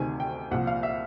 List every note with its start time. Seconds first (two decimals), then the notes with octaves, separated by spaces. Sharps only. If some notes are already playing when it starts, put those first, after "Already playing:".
Already playing: D2 C3 D#3 G#5
0.20 G5
0.51 C2 A#2 F3 F#5
0.67 F5
0.83 E5